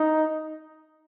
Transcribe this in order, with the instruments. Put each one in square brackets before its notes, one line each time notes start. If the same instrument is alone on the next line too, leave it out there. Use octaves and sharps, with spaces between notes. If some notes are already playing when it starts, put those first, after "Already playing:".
Already playing: [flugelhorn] D#4